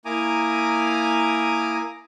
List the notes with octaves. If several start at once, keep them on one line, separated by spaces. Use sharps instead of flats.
A#3 E4 G#5 A#5 D6 D#6